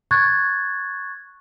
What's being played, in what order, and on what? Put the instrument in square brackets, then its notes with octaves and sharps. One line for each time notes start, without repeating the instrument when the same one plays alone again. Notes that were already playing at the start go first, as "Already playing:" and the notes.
[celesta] C#6 F#6 G#6 A6